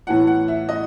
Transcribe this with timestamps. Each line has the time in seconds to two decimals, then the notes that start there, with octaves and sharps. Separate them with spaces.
0.07 A2 E3 F#5
0.27 F#5
0.48 E5
0.69 D#5